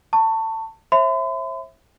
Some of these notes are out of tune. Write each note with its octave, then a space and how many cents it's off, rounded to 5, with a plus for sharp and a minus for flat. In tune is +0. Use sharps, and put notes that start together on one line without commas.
A5 +25 C#6 +0
C5 +45 E5 +0 B5 +45